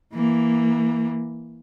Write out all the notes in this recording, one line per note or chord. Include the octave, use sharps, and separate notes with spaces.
E3 A#3